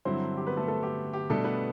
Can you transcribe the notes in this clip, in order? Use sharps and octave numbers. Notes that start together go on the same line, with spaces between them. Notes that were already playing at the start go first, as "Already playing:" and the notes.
G2 D3 F#3 C4 E4 C5
G4
B3 B4
A3 A4
A3 A4
G4
G4
B2 G3 A3 D4 A4
B3 B4